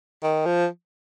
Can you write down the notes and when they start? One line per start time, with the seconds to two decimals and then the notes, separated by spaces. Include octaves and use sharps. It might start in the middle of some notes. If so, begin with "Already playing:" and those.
0.23 D#3
0.46 F3